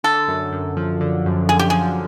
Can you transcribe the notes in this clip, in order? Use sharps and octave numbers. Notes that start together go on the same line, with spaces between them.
D3 A4
F#2
F#2
F3
D3
F#2
F#2 G#4
G4
F3 G#4